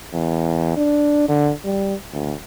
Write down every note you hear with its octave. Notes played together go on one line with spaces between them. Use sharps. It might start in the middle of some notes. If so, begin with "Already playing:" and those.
E2
D4
D3
G3
D2